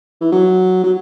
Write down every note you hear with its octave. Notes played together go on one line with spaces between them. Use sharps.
E3
F#3
F#3